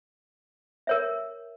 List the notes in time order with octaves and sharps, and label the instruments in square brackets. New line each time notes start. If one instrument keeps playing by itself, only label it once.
[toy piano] A#4 C#5 E5